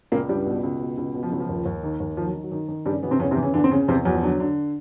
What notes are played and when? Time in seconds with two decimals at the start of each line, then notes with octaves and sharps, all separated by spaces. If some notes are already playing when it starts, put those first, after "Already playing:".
0.12 C#2 A#2 A#3
0.29 C#2 G2 G3
0.46 B2
0.63 C#2
0.80 B2
0.98 C#2
1.14 B2
1.23 F3
1.32 C#2 F#3
1.40 F3
1.49 D#2
1.66 D#2
1.83 D#3
2.00 D#2
2.17 D#3 F3
2.25 F#3
2.34 D#3
2.43 F#3
2.52 D#3
2.68 D#3
2.86 G2 C#3 G3
3.03 B2 E3 B3
3.11 C3 C4
3.20 E2 C#3 C#4
3.31 C3 C4
3.37 E3
3.43 C#3 C#4
3.54 E2 D3 D4
3.64 C4
3.71 C#3 C#4
3.88 E2 C3 C4
4.05 E2 F#3
4.14 F3
4.23 D3 F#3
4.40 D3